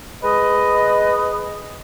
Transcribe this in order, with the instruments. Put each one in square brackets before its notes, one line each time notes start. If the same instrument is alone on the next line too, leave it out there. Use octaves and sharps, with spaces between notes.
[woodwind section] G#3 B4 D#5